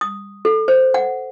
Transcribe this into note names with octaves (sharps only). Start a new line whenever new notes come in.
D#6
A4
C5
F#5